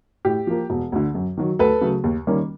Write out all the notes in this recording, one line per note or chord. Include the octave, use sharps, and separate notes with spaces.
A2 G4
F3 A#3
E1
D2 D3
F#2
D#3 F#3
D2 A4 B4
C#3 F#3 A3
D#2
D#3 G3 A#3 C#4